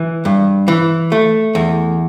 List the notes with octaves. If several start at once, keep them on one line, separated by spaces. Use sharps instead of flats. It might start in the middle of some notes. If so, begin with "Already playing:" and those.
Already playing: E3
G2
E3
A3
E2